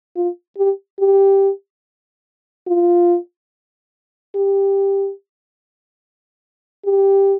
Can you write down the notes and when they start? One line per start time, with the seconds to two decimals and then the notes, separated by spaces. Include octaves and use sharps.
0.16 F4
0.58 G4
0.99 G4
2.67 F4
4.35 G4
6.85 G4